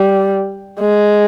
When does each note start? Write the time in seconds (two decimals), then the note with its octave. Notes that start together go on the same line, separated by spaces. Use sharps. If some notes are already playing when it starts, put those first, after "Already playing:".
Already playing: G3
0.80 G#3